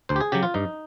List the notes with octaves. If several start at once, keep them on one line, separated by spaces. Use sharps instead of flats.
D2 C5
G4
G#4
C#3 F#3 G4
F4
G2 D#4